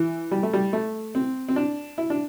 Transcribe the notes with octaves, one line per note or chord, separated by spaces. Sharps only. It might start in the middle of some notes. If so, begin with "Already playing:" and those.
Already playing: E3
G3
A3
G3
A3
C4
C4
D4
E4
D4